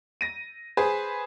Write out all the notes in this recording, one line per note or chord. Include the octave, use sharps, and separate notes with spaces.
A#6 D#7
G#4 B4 C5